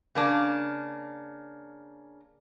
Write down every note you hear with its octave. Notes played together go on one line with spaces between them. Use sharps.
C#3 A#3 D4